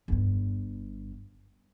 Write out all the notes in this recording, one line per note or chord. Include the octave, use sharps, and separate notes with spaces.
G1 G2